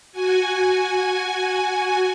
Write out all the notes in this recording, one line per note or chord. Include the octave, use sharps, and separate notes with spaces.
F#4 G#5